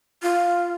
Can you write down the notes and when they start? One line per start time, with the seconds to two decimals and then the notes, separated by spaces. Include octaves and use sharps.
0.22 F4